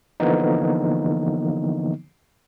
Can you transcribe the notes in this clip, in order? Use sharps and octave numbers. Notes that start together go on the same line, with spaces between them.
D3 E3 F3 A#3 B3 D#4